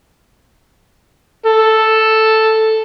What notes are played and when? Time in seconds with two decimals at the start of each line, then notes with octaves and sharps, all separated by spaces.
1.46 A4